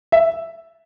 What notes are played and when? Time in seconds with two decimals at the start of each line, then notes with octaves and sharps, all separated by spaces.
0.12 E5